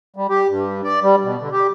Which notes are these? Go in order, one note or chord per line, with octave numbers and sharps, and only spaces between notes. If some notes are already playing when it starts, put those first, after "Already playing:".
G3
G4
G2
D5
G3
B2
D3
G4